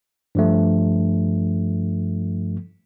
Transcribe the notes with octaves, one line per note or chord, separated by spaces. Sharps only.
G2 F3 A3